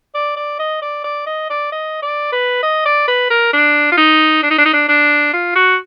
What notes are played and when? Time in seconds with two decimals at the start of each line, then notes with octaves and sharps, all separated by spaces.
0.15 D5
0.36 D5
0.59 D#5
0.82 D5
1.04 D5
1.27 D#5
1.50 D5
1.72 D#5
2.02 D5
2.32 B4
2.63 D#5
2.86 D5
3.08 B4
3.30 A#4
3.53 D4
3.92 F4
3.98 D#4
4.43 D4
4.51 D#4
4.58 D4
4.65 D#4
4.74 D4
4.89 D4
5.33 F4
5.56 F#4